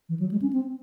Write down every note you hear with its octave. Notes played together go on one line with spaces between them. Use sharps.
E3
F#3
G#3
C#4
C4